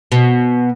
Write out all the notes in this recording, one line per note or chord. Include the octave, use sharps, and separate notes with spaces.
B2